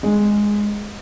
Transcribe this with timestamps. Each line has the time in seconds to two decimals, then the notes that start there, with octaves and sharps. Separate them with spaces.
0.03 G#3